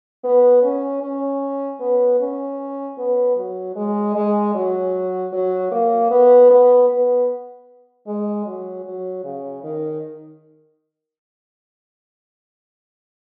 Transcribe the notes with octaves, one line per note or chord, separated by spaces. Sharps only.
B3
C#4
C#4
B3
C#4
B3
F#3
G#3
G#3
F#3
F#3
A#3
B3
B3
B3
G#3
F#3
F#3
C#3
D#3